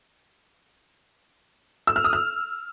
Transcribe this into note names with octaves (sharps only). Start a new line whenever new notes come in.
E6
F6
D#6
F6